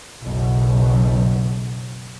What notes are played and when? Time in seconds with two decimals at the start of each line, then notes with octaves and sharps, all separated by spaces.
0.23 F#1 B1 F#2 B2